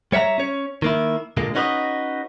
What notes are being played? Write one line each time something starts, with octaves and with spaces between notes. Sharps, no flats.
G3 C#5 E5 F5 A#5
C#4 C#5
D#3 A#3 E4
A#2 D3 G#3 A#3
C#4 D#4 F#4 B4 C#5 D#5